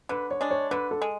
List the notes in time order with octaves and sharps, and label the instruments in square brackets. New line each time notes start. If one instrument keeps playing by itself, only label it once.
[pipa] D3 [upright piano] B4
[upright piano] C#5
[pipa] G#3 D4
[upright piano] C#5
[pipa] D3 [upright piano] B4
[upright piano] A4
[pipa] G#3